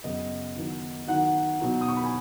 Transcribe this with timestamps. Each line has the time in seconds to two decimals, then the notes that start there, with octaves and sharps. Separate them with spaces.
0.04 F#2 C#3 B3 D#5
0.56 D#3 F#3 B3 D#4
1.07 D#3 F#3 D#4 F#5
1.60 B2 F#3 D#4
1.81 D#6
1.88 C#6
1.97 B5
2.04 G#5